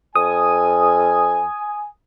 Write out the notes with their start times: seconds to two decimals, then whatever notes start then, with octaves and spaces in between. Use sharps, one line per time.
0.15 F2 G#5 D#6